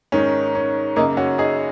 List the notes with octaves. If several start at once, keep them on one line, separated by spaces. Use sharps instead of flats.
G#2 D#3 C#4
C#4
F#2 C#3 A#3 D#4
C#4 F#4
D#4 G#4